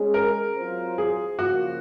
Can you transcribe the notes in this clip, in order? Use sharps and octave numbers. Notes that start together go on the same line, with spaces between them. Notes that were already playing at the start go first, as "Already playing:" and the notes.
Already playing: G#3 C#4 G#4
A#4
F#3 C4 F4 C5
G#4
C#3 F3 A#3 F4 F#4